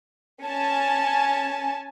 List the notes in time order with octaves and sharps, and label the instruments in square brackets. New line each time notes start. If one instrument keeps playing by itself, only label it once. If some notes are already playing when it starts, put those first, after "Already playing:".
[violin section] C#4 G#5 A5